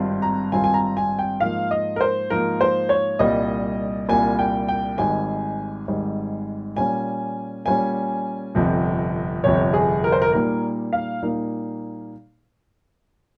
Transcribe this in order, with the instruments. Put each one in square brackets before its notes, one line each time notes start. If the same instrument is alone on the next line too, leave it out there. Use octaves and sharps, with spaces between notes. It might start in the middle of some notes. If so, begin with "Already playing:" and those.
Already playing: [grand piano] G#1 G2 G3 C4 F4
[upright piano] A#5
[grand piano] G#1 G2 G3 C4 F4 [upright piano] G#5
[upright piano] G#5
A#5
G#5
G5
[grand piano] G#2 F3 A#3 [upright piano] F5
[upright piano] D#5
A#4
C5
[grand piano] G#2 F3 A#3 [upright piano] A#4
[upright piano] C5
C#5
[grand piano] C2 A#2 G3 [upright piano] D#5
[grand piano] C2 A#2 G3 [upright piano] G#5
[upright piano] G5
G5
[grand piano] G#1 G#2 G3 [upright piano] G#5
[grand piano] G#1 G#2 G3
[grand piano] A#2 G3 C#4 [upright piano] G#5
[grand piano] A#2 G3 C#4 [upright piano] G#5
[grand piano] G1 F2 C3
[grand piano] G1 F2 C3 [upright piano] C#5
[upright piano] G#4
A#4
C5
A#4
[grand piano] A#2 G3 A#3 D#4 [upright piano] A#4
[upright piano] F5
[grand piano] A#2 G3 A#3 D#4